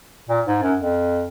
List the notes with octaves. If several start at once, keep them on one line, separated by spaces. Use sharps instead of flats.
A#2
G#2
F#2
F2